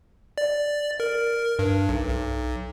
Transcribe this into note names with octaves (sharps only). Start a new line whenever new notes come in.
D5
A#4
G2
B1
B1